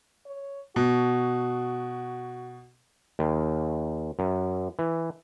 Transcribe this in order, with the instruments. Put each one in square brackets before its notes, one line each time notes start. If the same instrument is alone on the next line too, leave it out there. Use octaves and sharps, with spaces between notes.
[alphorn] C#5
[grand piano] B2 [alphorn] F#4
[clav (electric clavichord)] D#2
F#2
E3